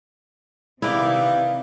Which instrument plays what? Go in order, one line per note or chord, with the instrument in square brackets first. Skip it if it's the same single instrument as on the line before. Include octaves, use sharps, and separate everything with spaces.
[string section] C3 [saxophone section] D#3 E3 [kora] E4 [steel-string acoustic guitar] D5 F5